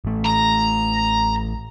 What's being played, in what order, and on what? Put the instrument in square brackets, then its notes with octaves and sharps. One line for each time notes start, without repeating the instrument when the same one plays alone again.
[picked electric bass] A1 A3
[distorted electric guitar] A#5